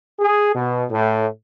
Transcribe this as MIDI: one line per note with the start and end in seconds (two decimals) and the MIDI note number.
0.19 0.54 68
0.56 0.84 47
0.91 1.27 45